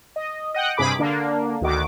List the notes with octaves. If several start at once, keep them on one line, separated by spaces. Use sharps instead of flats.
D#5
D#5 F#5 G5 F#6
G2 C3 G#4 B5 D6
D3 A#3 D4
D2 D#3 F#4 D6